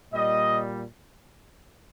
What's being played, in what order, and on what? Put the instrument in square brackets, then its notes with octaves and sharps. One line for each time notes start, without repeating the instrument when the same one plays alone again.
[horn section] A#2 G3 D#5